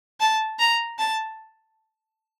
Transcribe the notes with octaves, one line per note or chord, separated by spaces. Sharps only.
A5
A#5
A5